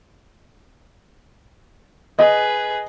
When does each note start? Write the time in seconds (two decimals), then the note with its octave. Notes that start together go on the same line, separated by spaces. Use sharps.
2.19 G#4 B4 D#5